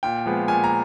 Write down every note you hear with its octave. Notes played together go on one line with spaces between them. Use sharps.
A#2 G5
F3 G#3 B3
A#2 G#5
A#5